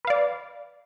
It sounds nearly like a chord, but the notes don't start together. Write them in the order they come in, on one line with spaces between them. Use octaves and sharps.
B4 F5 D5